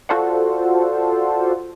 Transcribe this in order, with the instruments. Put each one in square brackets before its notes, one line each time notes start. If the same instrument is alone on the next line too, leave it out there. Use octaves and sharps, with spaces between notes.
[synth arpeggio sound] F4 F#4 A4 C5 D5 F#5